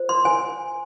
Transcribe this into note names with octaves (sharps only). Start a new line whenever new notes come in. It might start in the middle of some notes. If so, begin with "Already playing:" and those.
Already playing: F4 C5
C6
G#5